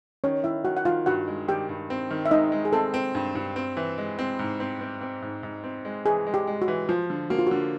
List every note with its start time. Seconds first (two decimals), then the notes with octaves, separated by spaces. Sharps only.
0.24 D#3 C#4 C#5
0.44 D#3 E4 E5
0.65 D#3 F#4 F#5
0.77 F#5
0.85 D#3 F4 F5
1.06 G2 F#4 F#5
1.27 G#3
1.48 D#3 G4 G5
1.69 G2
1.90 C4
2.11 D#3
2.26 E5
2.31 G#3 D#4 D#5
2.52 G#3
2.65 G#4
2.73 C4 A4
2.94 C4
3.15 G2
3.35 G2
3.56 C4
3.77 E3
3.98 G#3
4.19 C4
4.39 G#2
4.60 C4
4.81 C4
5.01 C4
5.22 G#2
5.43 G#2
5.64 C4
5.85 G#3
6.06 E3 G#4
6.27 G#3
6.34 G4
6.47 G#3
6.62 F#4
6.68 E3
6.89 F3 F4
7.10 D3
7.30 A#3 F#4
7.39 F4
7.47 D3 F#4